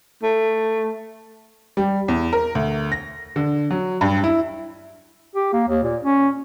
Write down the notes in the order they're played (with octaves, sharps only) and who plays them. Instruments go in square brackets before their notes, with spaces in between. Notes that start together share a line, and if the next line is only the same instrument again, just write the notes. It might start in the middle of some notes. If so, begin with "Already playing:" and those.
[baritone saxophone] A3
[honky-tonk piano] G3
E2
A#4
D2
A#6
D3
F#3
G2
E4
[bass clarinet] G4
A#3
D#2
A#2
C#4